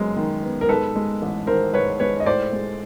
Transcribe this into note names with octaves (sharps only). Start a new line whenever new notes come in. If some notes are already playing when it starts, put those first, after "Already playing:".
Already playing: F#2 G#3 B3
D#3
B3
A#4
G#2 A4 B4
G#3
A1
D#3 A#4 C5
G#2 B4 C#5
G#3 B4 C#5
D#5
A2 C5 D5
G#3